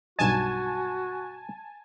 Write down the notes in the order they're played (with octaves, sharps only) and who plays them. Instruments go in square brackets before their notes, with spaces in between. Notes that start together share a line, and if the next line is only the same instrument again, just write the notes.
[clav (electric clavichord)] B1 G2 D#5 [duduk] F#4 [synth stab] G#5 A5